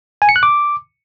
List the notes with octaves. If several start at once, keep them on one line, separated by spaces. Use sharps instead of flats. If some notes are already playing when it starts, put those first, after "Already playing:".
G#5
C#7
F#6
D6